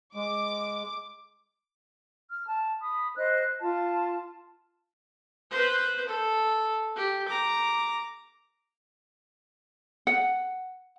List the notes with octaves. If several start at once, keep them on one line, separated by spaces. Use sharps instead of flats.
G#3 D6
F6
A5
B5 D#6
C5 D#5 F#6
F4 A5
B4 C5
A4
G4
A#5 D6
F#5